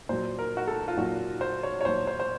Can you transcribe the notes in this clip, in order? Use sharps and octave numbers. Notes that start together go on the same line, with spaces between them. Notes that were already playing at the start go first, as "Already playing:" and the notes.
A#2 F#3 C5
A#4
F#4
A4
F4
A#2 F#3 F#4
C5
C#5
C#5
A#2 F#3 C5
C5
C5